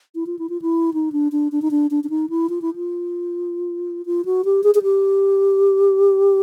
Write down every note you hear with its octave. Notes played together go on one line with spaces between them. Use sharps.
E4
F4
E4
F4
E4
D#4
D4
D4
D4
D#4
D4
D4
D4
D#4
E4
F4
E4
F4
F4
F#4
G4
G#4
G#4
G4